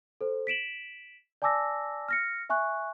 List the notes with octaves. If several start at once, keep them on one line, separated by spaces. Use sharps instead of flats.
A4 C5
B6 D7 E7 F#7
D5 G#5 A5 D6 E6 A#6
F6 A#6 C#7
E5 G#5 C#6 F#6